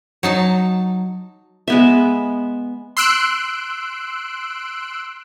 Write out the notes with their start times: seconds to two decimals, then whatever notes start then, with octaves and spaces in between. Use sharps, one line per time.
0.23 F#3 D#4 A5
1.68 G#3 B3 E5
2.97 C6 E6 F#6 D7